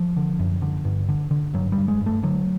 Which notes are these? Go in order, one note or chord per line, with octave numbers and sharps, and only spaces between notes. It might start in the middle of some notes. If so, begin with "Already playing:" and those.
Already playing: F3
D3
F#2
D3
G2
D3
D3
G2 F#3
G3
G2
G#3
G2
A3
D3 F#3